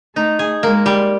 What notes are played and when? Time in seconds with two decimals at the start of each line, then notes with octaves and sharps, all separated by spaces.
0.15 A3 D#4
0.39 G#4
0.62 G#3 A#3
0.86 G3